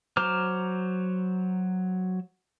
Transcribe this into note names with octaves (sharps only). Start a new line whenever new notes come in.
F#3 C5 A#5 D6 F6